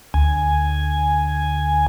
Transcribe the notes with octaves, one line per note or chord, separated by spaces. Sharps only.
D2 G#5